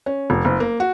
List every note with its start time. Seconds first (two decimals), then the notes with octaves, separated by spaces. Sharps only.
0.06 C#4
0.30 F1
0.45 F#1
0.60 A#3
0.80 F#4